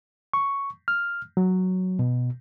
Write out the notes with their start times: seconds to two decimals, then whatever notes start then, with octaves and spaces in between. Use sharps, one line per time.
0.34 C#6
0.88 F6
1.37 F#3
1.99 B2